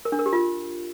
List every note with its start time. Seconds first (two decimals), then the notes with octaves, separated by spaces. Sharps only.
0.05 A#4
0.12 D4
0.19 A#4
0.26 G4
0.33 F4